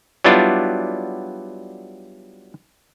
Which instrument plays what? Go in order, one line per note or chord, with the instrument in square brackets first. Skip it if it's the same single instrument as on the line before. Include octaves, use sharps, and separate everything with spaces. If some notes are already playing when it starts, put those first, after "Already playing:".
[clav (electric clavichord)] F#3 G3 B3 D4 E4 F4